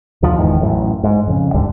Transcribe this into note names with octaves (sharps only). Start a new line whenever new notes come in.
D#2 D3 F3
F#1 E2 G#2 D#3
A1 F#2 A2
G#2
F2 C#3
D2 G#2 D3 G3